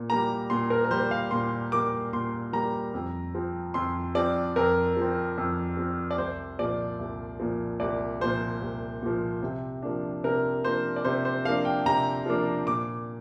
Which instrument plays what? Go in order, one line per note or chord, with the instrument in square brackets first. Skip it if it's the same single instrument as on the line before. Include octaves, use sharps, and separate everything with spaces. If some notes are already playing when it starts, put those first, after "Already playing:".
Already playing: [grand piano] A#2
G3 A#3 A#5
A#2 C6
A#4
A#4
G3 A#3 C5
F5
A#2 C6
G3 A#3 D6
A#2 C6
G3 A#3 A#5
F2
F3 C4
F2 C6
F3 C4 D5
F2 A#4
F3 C4
F2
F3 C4
D5
C2 C5
A#2 F3 D5
C2
A#2 F3
C2 D5
A#2 F3 C5
C2
A#2 F3
C3
F3 A#3 D4
C3 A#4
F3 A#3 D4 C5
D5
C3 C5
C5
F3 A#3 D4 F5
G5
C3 A#5
F3 A#3 D4
A#2 D6